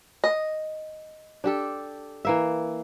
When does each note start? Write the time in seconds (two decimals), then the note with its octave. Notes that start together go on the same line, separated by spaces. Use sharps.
0.24 D#5
1.44 D4 G4 A4
2.25 E3 A#3 E5